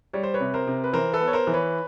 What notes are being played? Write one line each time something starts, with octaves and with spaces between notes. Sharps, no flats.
G3 C#5
C5
B4 C#5
C3
A#4 C5
C3
B4
E3 A#4 C5
A4 B4
B3
C#5
A#4 C5
E3
B4 C#5